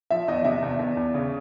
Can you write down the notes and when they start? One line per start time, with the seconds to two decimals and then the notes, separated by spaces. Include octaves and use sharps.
0.10 F3 E5
0.28 E2 D#5
0.45 C3 E5
0.62 E2
0.79 E2
0.97 E2
1.14 C#3